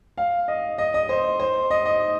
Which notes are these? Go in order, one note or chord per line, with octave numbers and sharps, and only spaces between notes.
F5
D#5
D#5
D#5
C5
C5
D#5
D#5